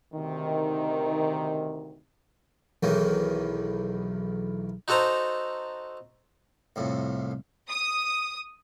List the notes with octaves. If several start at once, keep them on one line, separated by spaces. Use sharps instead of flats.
D2 C3 D#3
B1 E2 D#3 E3 F#3
D#4 F#4 A4 C5 A#5
C2 F2 A2
D#6